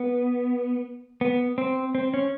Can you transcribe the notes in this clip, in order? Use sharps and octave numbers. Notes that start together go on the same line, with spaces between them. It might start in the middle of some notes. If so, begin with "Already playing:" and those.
Already playing: B3
B3
C4
C4
C#4